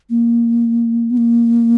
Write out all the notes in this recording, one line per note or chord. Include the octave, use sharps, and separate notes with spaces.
A#3
B3
A#3